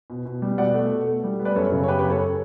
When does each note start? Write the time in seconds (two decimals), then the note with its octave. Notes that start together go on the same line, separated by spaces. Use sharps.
0.10 B2
0.26 B2
0.42 G3
0.58 B2 D5 F#5
0.74 A3
0.91 B2
1.07 A3
1.24 G3
1.39 B3
1.45 B4 D5
1.56 F#2 A4 C#5
1.72 C#3
1.84 C#5
1.88 B3 G4 B4
1.99 G4 B4
2.05 F#2
2.10 A4 C#5